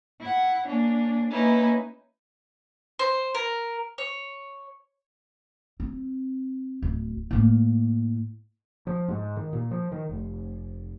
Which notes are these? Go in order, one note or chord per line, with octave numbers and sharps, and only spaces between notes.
E4 F#5
A#3 C#4 D4
A#3 C#4 D#4 E4 B4
C5
A#4
C#5
C4
D1
A2 A#3
F3
G#2
D#3
A#2
F3
D#3
F1